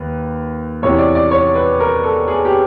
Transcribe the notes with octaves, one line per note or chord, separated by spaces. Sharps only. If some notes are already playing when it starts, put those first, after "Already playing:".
Already playing: D#2 B4
E2 C3 E3 C#5
D5
D5
C#5
B4
A#4
A4
G#4
G4